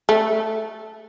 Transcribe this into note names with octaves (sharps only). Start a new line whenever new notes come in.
A3